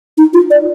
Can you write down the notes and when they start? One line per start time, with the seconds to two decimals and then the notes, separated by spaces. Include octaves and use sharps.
0.18 D#4
0.34 F4
0.51 D5